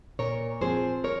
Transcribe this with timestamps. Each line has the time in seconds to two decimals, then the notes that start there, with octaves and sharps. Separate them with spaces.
0.19 A#2 A#4 C#5
0.61 F3 C4 G#4 C5
1.04 A#4 C#5